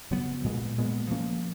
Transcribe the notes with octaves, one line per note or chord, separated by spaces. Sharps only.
C#3 F#3 B3
A#2 G#3 B3
A#2 G#3 B3
F3 A#3 C#4